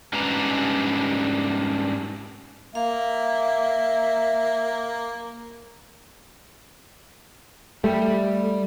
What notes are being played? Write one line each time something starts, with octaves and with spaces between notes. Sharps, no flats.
G#2 G3 C#4 D4 B4 A#5
A#3 E5 F5
G3 A3